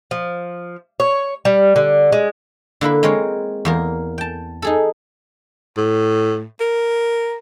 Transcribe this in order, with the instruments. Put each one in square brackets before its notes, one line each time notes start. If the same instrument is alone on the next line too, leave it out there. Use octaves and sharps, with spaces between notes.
[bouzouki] F3
C#5
G3
D3
G#3
[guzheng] D3 A#3 E4 B4
G#3 C4 A#4 C#5
E2 A#3 A#4
G5 A5
D#4 G#4 A4
[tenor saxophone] A2
A#4